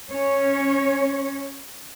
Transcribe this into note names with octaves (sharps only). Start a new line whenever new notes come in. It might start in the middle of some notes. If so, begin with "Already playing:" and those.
C#4 C#5